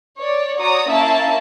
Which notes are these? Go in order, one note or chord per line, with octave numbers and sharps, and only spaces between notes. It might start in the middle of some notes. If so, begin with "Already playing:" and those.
C#5 D5
F#4 C#5 D5 A#5 D#6
A#3 C#4 E4 E5 A5